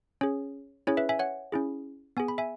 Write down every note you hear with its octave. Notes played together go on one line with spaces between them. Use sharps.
C#4 G#4 C#5
C#4 E4 G#4 C#5
B4 E5
E5 G#5
C#5 F#5
C#4 E4 G#4
B3 G#4 G#5
B5
E5 G#5